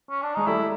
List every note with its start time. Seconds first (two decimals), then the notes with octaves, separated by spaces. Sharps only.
0.10 C#4
0.23 D4
0.35 G#3 D#4
0.47 G3 A3 E4